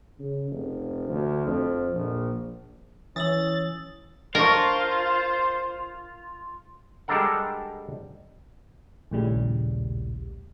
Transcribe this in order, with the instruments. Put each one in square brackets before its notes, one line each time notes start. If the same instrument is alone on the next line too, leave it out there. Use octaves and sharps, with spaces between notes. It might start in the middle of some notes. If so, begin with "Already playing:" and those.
[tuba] C#3
F1
D2
F2
A#1
[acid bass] E3 [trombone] C#4 [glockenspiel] D#6 E6 F#7 [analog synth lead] A6
[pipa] D4 C#6 [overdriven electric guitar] F4 [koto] A#4 [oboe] C5
[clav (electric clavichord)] G3 G#3 D4 A4 A#4 F#5
[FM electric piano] A#1 D#2 A2 C#3 G3